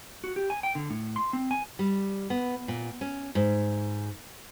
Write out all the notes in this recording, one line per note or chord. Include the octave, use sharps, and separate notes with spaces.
F#4
G4
G#5
G5
D3
A2
C6
C4
G#5
G3
B3
A#2
C#4
G#2